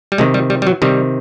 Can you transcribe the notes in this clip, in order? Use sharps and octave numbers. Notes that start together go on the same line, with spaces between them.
G3
C3 D#3 G#3
G3
G3
G3
F#3
C3 D#3 G3